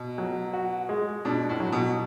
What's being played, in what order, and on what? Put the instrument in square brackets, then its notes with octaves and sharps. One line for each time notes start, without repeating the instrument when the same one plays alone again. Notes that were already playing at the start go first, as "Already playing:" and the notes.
Already playing: [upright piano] B2
[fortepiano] F#3
F#4
G#3
[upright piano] B2 [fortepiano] D4
[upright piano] A2
[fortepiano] F#3
[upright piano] B2